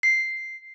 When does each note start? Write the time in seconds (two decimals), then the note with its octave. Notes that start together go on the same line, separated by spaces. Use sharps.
0.03 C7